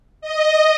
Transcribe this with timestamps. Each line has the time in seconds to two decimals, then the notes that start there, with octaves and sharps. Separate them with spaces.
0.21 D#5